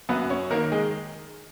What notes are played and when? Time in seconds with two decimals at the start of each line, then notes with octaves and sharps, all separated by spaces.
0.09 F#2 B3 B4
0.30 C#4 C#5
0.50 D#3 A#3 A#4
0.72 G#3 G#4